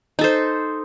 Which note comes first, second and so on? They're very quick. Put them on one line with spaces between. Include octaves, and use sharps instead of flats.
D#4 A4 C5